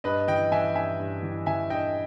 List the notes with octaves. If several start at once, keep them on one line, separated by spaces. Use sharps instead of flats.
G2 B4 D#5
E3 D#5 G5
E3 E5 G#5
G2 E5 G#5
G2
E3
E3 E5 G#5
G2 D#5 G5